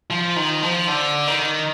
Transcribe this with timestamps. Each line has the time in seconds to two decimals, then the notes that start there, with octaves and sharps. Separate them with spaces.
0.10 F3
0.36 D#3
0.63 F3
0.88 D3
1.27 D#3